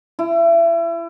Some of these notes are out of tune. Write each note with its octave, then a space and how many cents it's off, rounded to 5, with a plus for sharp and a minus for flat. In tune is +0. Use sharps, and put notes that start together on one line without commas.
E4 +30